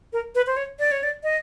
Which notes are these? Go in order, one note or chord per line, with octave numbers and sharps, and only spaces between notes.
A#4
B4
C5
C#5
D5
C#5
D5
D#5